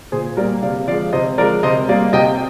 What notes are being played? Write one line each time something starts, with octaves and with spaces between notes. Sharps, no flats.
A#2 G#4 C5
G3 A#3 A#4 D5
C3 D5 F5
F3 G#3 D5 F5
C3 C5 D#5
F3 G#3 A#4 D5
C3 C5 D#5
G3 A#3 D5 F5
C3 D#5 G5